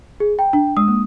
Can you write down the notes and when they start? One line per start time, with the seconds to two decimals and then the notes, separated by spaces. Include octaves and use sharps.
0.20 G#4
0.39 G5 A#5
0.53 D4
0.77 G#3 D#6
0.88 A#3